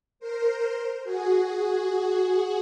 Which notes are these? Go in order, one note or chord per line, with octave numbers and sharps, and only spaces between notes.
A#4 C5
F#4 G#4
F#4 G#4